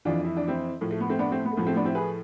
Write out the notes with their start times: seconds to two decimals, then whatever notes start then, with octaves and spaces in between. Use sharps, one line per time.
0.05 F2 E3 D4 F4
0.25 E4
0.37 D4
0.47 C4 E4
0.81 A2 F3
0.91 A3
1.00 B3
1.10 A3 C4
1.19 B3 D4
1.32 A3 C4
1.45 B3
1.52 A3
1.57 A2 F3 B3
1.67 A3 C4
1.76 B3 D4
1.85 C4 E4
1.95 G#4 B4